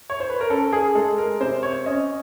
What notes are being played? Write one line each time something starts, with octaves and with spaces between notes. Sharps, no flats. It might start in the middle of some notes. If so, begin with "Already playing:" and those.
C#5
C5
B4
A#4
C#4 A4
G#4
G#3 A4
A#4
C3 C5
C#5
C#4 D#5